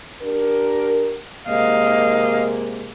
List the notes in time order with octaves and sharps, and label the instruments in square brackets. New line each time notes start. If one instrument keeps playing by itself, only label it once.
[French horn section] D4 G4 A#4
[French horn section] C3 G#3 A#3 [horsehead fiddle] D#5 F5